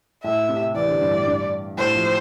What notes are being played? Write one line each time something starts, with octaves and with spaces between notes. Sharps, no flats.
A2 E5
C3
E3 D5
D3
G2
A2
G2
A2 C5
F3